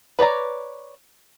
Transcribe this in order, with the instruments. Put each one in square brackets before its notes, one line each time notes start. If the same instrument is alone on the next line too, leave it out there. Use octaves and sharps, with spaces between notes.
[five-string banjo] B4 C#5 D5 A#5